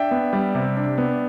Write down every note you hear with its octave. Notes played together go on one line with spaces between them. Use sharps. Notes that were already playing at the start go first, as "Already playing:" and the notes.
Already playing: D4 E5 G5
B3
G3
C3
D4
B3